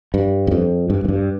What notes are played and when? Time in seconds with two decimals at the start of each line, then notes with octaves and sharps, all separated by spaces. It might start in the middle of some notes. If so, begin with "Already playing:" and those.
0.14 G2
0.47 E2
0.51 F2
0.90 G2
1.05 F2
1.08 G2